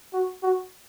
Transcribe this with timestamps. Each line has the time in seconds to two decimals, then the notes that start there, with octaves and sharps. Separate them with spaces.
0.13 F#4
0.43 F#4